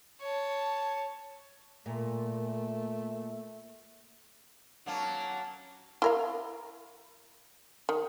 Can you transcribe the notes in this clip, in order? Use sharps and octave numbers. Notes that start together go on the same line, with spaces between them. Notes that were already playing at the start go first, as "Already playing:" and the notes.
C#5 A5
A#2 A3
F#3 A#3 C#4 A5
E4 A#4 F5
D#3